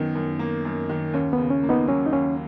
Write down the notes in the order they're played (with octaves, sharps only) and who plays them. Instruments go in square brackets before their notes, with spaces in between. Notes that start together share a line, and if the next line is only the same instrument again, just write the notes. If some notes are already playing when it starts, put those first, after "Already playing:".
Already playing: [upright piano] F#2 D#3 [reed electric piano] B3 D#4
[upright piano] F#2
A#3
F#2
D#3
[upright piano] D#2 [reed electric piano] C#4
[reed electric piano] B3
[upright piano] C#3
[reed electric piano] C#4
[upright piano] A#3
[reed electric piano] B3 D#4
[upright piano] F#3 [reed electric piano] C#4
[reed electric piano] D#4
[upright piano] D#2 [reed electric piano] C#4